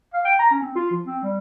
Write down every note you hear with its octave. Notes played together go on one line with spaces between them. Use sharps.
F5
G5
A#5
C#4
C4
F4
F3
C4
G3